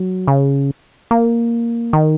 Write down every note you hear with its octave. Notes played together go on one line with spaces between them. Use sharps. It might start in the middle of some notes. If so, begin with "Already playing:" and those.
Already playing: F#3
C#3
A#3
D#3